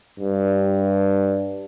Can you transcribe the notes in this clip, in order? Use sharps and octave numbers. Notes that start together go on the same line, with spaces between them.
G2